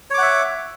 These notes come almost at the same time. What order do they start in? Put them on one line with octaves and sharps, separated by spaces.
C#5 D6 F#5 E5